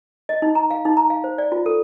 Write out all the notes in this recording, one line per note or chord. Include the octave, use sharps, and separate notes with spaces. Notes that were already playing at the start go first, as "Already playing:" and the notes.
D#5
D#4
A#5
F5
D#4
A#5
F5
C5
D5
F4
A4